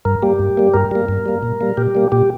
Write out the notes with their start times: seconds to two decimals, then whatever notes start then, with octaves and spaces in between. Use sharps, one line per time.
0.05 G2 A#4
0.22 G3 A#3 G4
0.39 G2
0.57 G3 A#3
0.74 G2 A#4
0.91 G3 A#3
1.09 G2
1.26 G3 A#3
1.43 A#2
1.61 G3 A#3
1.77 A#2 G4
1.95 G3 A#3
2.12 A#2 G4